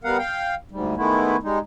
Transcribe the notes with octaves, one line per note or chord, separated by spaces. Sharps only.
G3 B3 A#4 F5 F#5
F5 G5
D2 G#2 G3
D#3 G#3 A3 B3 E4
G3 G#3 D#4